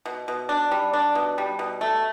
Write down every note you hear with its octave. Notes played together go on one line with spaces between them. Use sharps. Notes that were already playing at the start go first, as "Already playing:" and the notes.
B2
B2
D4
G3
D4
B2
G3
B2
A3